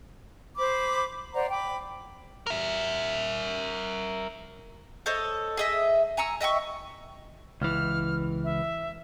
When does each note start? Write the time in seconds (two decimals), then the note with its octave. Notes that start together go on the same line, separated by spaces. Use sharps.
0.57 C5 B5 D6
1.34 C5 D5 F#5 A#5
1.49 G5 B5 D6
2.47 A#4 E5
5.06 A4 C5 C#5 D#5
5.57 G#4 D#5 E5
6.17 G#5 A#5 C#6 E6
6.41 D#5 E5 G5 C#6
7.62 C#2 E3 F6
8.44 E5